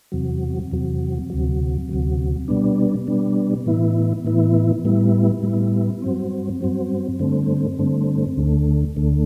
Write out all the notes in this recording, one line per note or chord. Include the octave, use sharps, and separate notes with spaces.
E2 C3 F#3
E2 C3 F#3
D2 C3 F#3
D2 C3 F#3
B2 G3 B3 D4
B2 G3 B3 D4
A2 E3 B3 E4
A2 E3 B3 E4
A2 G3 B3 E4
A2 G3 B3 E4
G2 F#3 C4
G2 F#3 C4
G2 D3 A3 C4
G2 D3 A3 C4
D2 D3 A3
D2 D3 A3